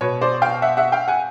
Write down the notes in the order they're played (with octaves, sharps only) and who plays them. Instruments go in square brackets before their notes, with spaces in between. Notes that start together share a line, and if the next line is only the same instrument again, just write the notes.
[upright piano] B2 B4 C#5
C5 D5
F5 G5
E5 F#5
E5 F#5
F5 G5
F#5 G#5